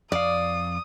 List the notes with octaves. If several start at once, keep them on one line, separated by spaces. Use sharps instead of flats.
F2 D5 F5 D#6